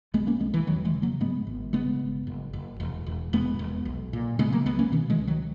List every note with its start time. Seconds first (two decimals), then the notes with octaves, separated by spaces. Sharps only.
0.14 B1 G#3 B3
0.27 A#3 C#4
0.40 B1 G#3 B3
0.54 E3
0.67 E1 D#3 F#3
0.85 E3 G#3
0.94 C#3
1.02 F#3 A#3
1.20 G#2 G#3 B3
1.47 G#1
1.73 C#3 G#3 B3
2.00 G#1
2.27 F#1
2.53 F#1
2.80 E1
3.07 E1
3.33 E1 G#3 B3
3.59 E1
3.85 B1
4.13 A#2
4.39 C#3 G#3 B3
4.52 F#3 A#3
4.65 C#2 G#3 B3
4.79 A#3 C#4
4.92 B2 D#3
5.10 E3 G#3
5.18 C#2
5.27 D#3 F#3